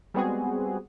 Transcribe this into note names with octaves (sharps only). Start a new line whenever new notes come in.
G3 G#3 B3 C4 F#4 G#4